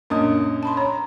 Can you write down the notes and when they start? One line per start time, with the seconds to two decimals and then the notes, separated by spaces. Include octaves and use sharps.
0.10 F#2 A#2 D4 D#5 D#6
0.63 A5 B5 C6
0.77 C#5 A#5